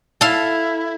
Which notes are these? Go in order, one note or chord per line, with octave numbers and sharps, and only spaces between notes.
E4 A4 F5